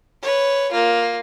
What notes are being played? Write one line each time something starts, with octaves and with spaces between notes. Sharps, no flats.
B4 C#5
A#3 F4